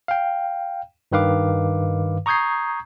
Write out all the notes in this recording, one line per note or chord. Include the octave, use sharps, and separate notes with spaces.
F5 G5
G2 D#3 B4 F5 D6
A#5 C#6 D#6 G6 G#6 C7